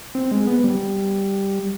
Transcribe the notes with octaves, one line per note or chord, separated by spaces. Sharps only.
C4
G#3
B3
G3